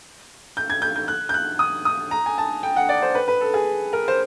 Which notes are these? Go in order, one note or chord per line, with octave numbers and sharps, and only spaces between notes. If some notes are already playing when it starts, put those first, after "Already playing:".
G6
G#6
G6
G6
F#6
G6
F#6
D#6
D#6
A#5
G#5
A5
G5
F#5
D5
C5
B4
B4
A4
G#4
A#4
C5